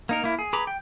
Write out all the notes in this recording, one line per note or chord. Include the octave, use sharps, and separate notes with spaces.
A#3 D#4 A#4
A#3 E4
G#4
G#4 B4 A#5 B5 D6
G5